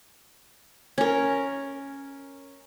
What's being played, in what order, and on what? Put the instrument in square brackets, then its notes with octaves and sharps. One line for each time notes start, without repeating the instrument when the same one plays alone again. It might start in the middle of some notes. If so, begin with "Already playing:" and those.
[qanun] C#4 A#4